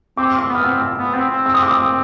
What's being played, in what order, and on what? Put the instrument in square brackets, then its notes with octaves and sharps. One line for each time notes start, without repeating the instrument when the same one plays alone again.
[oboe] C4 [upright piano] D6
[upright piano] D6
[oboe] B3
[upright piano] F6
E6
[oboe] C4
[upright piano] E6
[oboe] B3
C4
C4
[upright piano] E6
D#6
D6
D#6